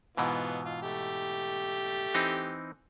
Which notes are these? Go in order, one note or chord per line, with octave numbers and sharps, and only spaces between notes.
G#2 B2 E3 B3 F4
F4
A3 G4
E3 C4 D#4